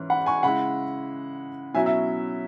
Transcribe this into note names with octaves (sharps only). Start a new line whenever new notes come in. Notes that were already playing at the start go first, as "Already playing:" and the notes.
Already playing: G#2 E3 C#4
F#5 B5
G#5 C#6
C#3 G#3 E4 F#5 B5
B2 F#3 C#4 E4 E5 G#5
E5